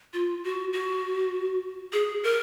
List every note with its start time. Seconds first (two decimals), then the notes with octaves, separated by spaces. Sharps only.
0.13 F4
0.44 F#4
0.73 F#4
1.93 G#4
2.24 A#4